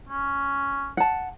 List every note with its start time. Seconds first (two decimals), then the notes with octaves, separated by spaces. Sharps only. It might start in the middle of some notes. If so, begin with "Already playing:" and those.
0.09 C#4
0.97 F#5 A5